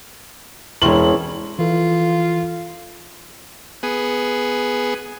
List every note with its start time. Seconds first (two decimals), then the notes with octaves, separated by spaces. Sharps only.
0.82 E1 E3 C4 C#4 F#7
1.59 E3 F4 A4
3.83 B3 G#4